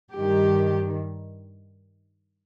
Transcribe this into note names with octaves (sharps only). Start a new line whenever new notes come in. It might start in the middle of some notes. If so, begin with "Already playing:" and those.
G2 D#3 G3 G4